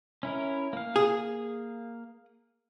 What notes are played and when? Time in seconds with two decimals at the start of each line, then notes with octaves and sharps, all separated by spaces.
0.23 C#4 E4 A#4
0.73 A#3 F5
0.96 G#4